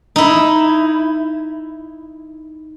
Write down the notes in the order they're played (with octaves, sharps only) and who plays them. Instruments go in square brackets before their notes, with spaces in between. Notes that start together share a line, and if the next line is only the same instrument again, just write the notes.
[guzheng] D#4 E4